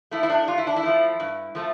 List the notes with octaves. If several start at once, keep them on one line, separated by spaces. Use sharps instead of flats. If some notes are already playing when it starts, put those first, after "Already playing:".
F3 A3 E4
E4
D4
G2 F4
E4
D4
E4
F3 A3
G2
F3 A3